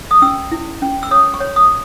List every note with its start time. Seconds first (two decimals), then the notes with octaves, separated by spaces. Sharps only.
0.11 D#6
0.22 C#4 E6
0.51 E4
0.82 C#4
1.03 E6
1.11 C#5 D#6
1.34 C#6
1.40 C#5
1.56 D#6